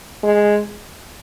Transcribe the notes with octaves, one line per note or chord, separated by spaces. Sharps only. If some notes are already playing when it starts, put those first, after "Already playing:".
G#3